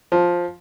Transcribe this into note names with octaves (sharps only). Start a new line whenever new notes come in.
F3